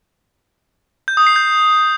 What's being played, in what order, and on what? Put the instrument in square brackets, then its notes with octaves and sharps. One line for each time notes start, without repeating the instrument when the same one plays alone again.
[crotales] G6
D#6
C7
G6